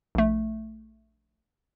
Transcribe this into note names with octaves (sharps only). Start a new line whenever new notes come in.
A#1 A3